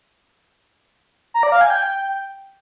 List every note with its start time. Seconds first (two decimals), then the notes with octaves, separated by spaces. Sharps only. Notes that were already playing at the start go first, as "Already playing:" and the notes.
1.34 A#5
1.43 D5
1.52 F5
1.61 G#5
1.70 G5